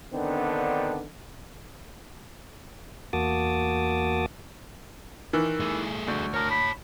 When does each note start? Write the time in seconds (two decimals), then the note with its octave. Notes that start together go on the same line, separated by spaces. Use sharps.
0.13 D3 D#3 B3 C4 D4
3.13 E2 A#3 F#4 A5 D6 D#6
5.33 D#3 E3
5.60 A3 G#4
6.08 D2
6.34 A#4 C#5 A5
6.51 B5